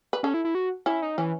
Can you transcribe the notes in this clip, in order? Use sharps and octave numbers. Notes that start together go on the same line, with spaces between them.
B4
C#4 A4
E4
E4
F#4
C#4 E4
D#4
E3 C#4